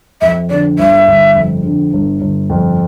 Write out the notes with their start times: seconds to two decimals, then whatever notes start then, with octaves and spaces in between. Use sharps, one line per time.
0.21 F2 E5
0.50 D3 D5
0.79 G1 E5
1.08 G1
1.35 F2
1.64 D3
1.93 G1
2.21 G1
2.50 F2